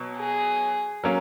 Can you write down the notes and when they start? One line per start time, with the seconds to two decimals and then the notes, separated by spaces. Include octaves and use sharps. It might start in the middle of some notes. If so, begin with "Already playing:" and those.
Already playing: B2 F#3
0.18 G#4
1.04 F#3 A#3 C#4